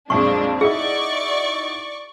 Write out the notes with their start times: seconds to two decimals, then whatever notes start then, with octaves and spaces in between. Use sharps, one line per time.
0.10 B1 F2 A#2 G#3 D4 C#6
0.61 D#4 E4 F#4 G#4 D5 C#6